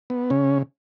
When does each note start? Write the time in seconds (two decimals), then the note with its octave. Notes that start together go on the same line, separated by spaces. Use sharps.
0.10 B3
0.30 C#3 C#4